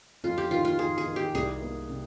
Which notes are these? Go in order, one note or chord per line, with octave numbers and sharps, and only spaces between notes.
F2 F4
G4
D#3 F4
F4
D#3 G#4
G#4
D#3
G4
C2 G#4
A#3
C3